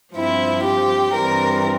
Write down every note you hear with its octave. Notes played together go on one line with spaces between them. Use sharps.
G2 F3 C4 E4
G4
G2 E3 G3 C4 A#4